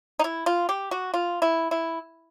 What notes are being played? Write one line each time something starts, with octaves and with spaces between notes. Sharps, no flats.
D#4
E4
F4
G4
F#4
F4
E4
E4